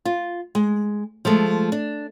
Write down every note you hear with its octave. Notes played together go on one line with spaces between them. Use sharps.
F4
G#3
F3 G#3 A3 A4
D4